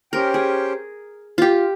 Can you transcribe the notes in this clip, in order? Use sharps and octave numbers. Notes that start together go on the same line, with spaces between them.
C#4 G4 A#4 C5 G5
G#4
F4 G4